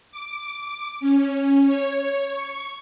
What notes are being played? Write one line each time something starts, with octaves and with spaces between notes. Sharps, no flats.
D6
C#4
C#5
C#6